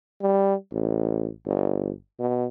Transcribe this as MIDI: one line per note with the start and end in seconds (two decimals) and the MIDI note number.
0.22 0.54 55
0.72 1.29 33
1.45 1.90 31
2.20 2.46 47